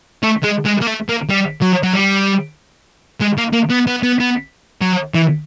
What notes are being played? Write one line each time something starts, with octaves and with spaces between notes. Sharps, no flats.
A3
G#3
G#3
A#3
A3
A#3
G3
F#3
F#3
G3
G#3
A#3
A#3
B3
B3
B3
B3
F#3
E3